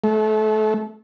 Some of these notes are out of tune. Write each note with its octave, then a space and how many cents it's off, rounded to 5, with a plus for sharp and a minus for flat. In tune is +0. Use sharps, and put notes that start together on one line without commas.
A3 -30